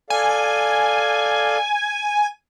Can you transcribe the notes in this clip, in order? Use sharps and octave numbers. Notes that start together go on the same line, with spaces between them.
A4 D5 F5 G#5